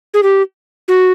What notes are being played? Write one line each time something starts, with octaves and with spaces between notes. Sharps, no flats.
G#4
G4
F#4